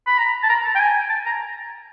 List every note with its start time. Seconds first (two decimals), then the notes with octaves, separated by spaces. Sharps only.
0.07 B5
0.18 A#5
0.43 A5
0.49 A#5
0.64 A5
0.75 G5
0.80 G#5
1.09 A5
1.26 A#5